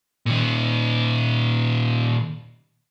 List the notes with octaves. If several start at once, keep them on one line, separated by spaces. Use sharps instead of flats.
A#2 D#3